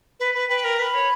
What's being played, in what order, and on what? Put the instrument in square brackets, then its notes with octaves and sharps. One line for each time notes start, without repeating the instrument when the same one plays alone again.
[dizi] B4
B4
[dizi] B4 [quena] G5
[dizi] A#4
[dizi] B4 [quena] B5
[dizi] C#5